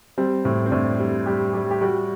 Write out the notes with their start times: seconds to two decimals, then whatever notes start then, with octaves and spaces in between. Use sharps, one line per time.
0.18 G3 C4
0.45 A2 C4
0.66 C4
0.71 A2 D4
0.99 G3
1.26 G3 G4
1.53 G3 G4
1.71 G4
1.81 G3 F#4